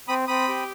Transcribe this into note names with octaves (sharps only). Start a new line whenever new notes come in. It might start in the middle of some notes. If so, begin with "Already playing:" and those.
C4 B5 D#6
C4 B5 D#6
G4